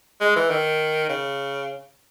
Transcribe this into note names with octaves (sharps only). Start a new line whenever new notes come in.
G#3
E3
D#3
C#3